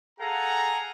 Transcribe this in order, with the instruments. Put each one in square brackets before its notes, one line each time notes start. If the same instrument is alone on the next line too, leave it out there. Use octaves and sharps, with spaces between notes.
[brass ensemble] G#4 A4 F5 F#5 G#5 A#5